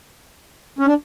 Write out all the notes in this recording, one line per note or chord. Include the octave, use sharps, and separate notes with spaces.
C#4
D4